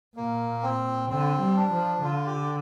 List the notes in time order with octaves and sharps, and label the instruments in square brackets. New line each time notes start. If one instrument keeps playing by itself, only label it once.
[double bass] A#2 [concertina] A#3
[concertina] C4
[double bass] D3 [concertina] C4
[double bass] G3
[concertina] D4
[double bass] F3
[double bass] D3 [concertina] F4
[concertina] G4